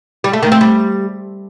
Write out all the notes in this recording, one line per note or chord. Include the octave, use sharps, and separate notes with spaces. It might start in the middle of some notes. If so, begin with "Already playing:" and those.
G3
A3
D#3
C4
G3